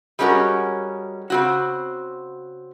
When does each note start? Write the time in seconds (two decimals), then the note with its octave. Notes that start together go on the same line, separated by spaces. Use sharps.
0.19 G3 G#3 C#4 F#4 A#4 C#5
1.30 C#3 C4 F#4